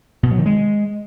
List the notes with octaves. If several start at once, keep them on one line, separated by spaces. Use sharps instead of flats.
B2
F#3
D#3
G#3